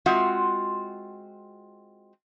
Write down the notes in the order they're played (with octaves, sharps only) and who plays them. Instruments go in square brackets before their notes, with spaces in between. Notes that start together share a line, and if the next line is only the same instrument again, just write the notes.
[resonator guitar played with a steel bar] G#3 C4 F4 F#4 E5 F#5